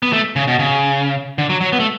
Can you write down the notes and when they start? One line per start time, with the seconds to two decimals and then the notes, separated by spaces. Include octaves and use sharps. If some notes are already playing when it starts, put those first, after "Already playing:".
0.03 B3
0.13 A3
0.36 C#3
0.48 B2
0.59 C#3
1.38 D3
1.50 F#3
1.61 F#3
1.73 B3
1.80 A3